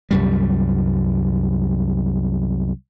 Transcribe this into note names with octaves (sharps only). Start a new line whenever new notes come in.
C2 F#2 G3